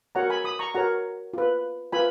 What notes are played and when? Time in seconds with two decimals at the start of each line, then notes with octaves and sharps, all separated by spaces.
0.15 F#4 A#4 C#5 F#5 A#5
0.30 G#5 B5
0.44 B5 D#6
0.59 A#5 C#6
0.75 F#4 A#4 C#5 F#5 A#5
1.34 F4 B4
1.92 F4 B4 G#5 B5